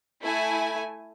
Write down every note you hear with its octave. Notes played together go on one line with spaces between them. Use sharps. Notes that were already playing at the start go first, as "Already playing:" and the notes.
A3 E4 G#5